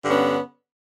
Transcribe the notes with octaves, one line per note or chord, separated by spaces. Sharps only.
G2 D3 B3 C#4